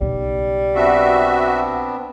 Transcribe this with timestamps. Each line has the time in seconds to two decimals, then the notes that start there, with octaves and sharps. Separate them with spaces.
0.01 B1 C#3 G3
0.75 B3 C4 D4 F#4 E5